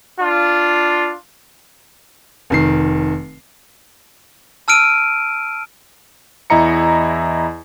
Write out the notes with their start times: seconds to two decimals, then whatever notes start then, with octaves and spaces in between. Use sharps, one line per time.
0.18 D4 F4
2.50 F1 D#3 C7
4.68 A5 E6 F6 D7 D#7
6.50 E2 E4 D#5 A#5 C#7